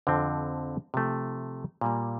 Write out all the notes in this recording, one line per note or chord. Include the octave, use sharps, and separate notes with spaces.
F2 D3 F3 C4
C3 F3 A3
A#2 G3 A#3